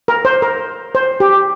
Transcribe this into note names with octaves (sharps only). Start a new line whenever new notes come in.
A#4
C5
A#4
C5
G4